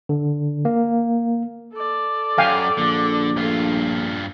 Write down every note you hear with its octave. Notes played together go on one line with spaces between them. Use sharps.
D3
A#3
A4 D5
F#2 F5 G5 G#5
A#1 D3
G2 A3 F4 A4